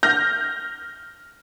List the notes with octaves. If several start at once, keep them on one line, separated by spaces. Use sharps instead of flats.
F6 G6 A#6